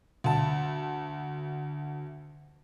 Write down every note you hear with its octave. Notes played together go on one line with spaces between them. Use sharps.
D2 A5